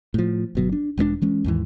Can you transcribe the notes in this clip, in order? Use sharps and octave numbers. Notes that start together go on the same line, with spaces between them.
A2 F3
G1 B2 F#3
D4
E1 G#3 B3 D4
E3 G#3 C#4
D#2 G#2 E3